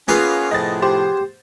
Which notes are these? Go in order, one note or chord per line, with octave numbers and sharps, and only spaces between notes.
A#3 B3 C#4 F4 G#4 B4
A2 C3 F3 D#5 A6
G4 C5